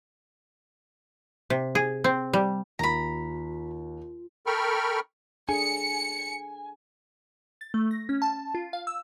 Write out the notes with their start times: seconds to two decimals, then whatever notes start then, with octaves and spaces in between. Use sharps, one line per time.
1.50 C3
1.75 G#4
2.04 C4
2.33 G3
2.79 D#2 F4 A#5 B5
4.46 A4 A#4 G5 B5 C#6 F6
5.49 D4 G#4 A4 G#5 C#7
7.61 A6
7.74 A3
7.91 A#6
8.09 C#4
8.22 A5
8.55 F4
8.73 F5
8.87 E6